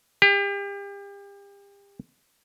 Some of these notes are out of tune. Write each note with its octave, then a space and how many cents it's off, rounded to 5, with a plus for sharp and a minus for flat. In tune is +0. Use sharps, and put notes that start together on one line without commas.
G4 +35